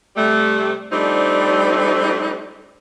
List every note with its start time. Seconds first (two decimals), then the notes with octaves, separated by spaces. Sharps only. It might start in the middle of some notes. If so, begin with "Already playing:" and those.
0.17 C3 G3 A3
0.92 F3 G3 A3 C4 D4 D#4